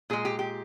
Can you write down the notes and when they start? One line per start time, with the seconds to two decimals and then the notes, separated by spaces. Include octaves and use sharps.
0.10 A#2 G#3 G#4
0.25 G4
0.39 G4